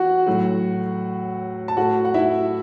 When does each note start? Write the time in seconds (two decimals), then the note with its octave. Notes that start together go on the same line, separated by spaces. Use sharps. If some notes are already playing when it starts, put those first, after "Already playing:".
Already playing: E2 F#4 F#5
0.26 A2 F#3 A3
1.68 A5
1.77 A2 A3 F#4 F#5
2.05 F#5
2.14 E4 E5